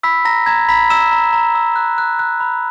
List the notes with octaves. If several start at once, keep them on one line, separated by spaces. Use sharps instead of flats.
B5 E6 B6
A#5 A#6
A#5 G#6
A#5 B5 B6
A#5 E6 E7
A#5
A#5
E6
F#6
F#6
F#6
B5